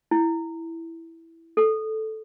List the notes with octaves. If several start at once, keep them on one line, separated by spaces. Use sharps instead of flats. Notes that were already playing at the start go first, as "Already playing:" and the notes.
E4
A4